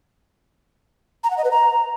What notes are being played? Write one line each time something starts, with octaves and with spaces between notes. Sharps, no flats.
A#5
F#5
D#5
B4
A#5